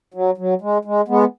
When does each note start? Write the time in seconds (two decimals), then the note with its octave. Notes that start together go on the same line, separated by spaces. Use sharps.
0.14 F#3
0.38 F#3
0.61 G#3
0.85 G#3
1.08 G#3 B3